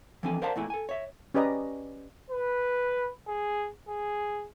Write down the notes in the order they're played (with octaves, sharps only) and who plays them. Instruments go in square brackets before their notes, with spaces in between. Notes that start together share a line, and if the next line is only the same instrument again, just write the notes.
[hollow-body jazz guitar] E3 F3 C4 D4 A4 G#5
A#4 C5 D5 F5 F#5 A5
E2 A#2 E3 A3 E4 G#5
A4 G#5
C#5 E5
[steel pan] C#4 G4 B4 D5 D#5 A#5
[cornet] B4
G#4
G#4